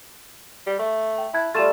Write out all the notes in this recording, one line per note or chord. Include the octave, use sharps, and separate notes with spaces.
G3
A3
G5
E4 A5 F#6 G#6
G3 A3 F4 A6 E7